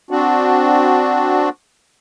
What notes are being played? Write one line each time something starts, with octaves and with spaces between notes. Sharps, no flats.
C4 D4 F#4